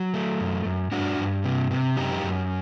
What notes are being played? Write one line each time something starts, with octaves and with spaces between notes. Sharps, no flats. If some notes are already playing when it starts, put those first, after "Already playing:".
Already playing: F#3
A3
F#2
F#2
G2 D4 F#4
G2
C3
C3
F#2 D#4 G4
F#2